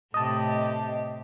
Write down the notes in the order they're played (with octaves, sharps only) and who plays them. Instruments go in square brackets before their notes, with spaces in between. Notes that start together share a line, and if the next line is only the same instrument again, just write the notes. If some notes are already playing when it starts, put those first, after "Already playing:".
[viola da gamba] A2 C3 G4 [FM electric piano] D#5 A5